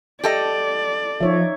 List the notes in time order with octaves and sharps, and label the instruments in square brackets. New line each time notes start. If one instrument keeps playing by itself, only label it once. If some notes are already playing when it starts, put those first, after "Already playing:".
[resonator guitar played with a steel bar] G4 A4 D#5 [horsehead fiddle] D5
[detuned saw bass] F3 [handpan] D#4 C#5 E5